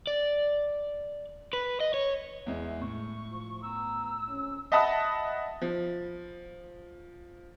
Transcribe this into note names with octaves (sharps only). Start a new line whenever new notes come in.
D5
B4
D#5
C#5
E2 G#3 E5
A2 C#6
F3
B3 A#5 E6
F2 C#4
D#5 E5 F#5 A5 B5 D#6
F3